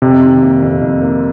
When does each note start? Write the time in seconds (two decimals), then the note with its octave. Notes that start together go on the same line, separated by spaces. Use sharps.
0.02 F2 C3
0.22 D#3
0.42 A#3
0.63 F2
0.82 F2
1.02 A#3